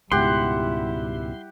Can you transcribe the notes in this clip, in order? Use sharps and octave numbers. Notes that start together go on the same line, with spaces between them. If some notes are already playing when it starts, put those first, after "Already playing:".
C#2 G#2 B2 G3 E4 G4 F#5 C6